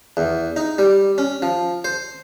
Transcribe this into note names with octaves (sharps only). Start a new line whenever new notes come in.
E2
D#4
G3
C#4
F3
C5